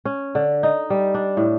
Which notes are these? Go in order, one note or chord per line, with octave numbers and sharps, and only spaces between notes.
C#4
D3
D#4
G3
D4
A2